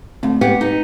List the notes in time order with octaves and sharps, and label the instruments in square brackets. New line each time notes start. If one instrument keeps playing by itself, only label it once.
[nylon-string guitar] D2 [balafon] A3 C4
[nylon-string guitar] B3 G4 F#5 [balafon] G5
[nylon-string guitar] D#4